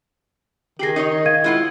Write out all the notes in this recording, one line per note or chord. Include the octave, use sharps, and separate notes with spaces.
D#3 G4 G#4 A#6 C7 F#7
D#4 C#5 D#5
F5 G#6 D#7
G#3 E4 F4 F#5